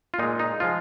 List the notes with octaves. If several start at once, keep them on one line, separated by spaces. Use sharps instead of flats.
F4
A#2 G#3 D#4
D#4
F3 G#3 F4